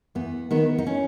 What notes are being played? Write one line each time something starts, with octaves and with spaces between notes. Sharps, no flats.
E2 B3
D#3 B3
D#4
C#4